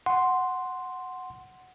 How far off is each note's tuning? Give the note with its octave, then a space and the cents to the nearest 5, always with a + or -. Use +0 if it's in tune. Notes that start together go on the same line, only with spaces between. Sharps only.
F#5 +0 C6 +0